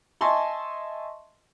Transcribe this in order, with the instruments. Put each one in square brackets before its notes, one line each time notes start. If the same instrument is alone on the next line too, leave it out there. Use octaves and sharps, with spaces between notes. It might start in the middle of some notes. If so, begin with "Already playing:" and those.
[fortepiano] D#5 E5 G#5 A5 C6 C#6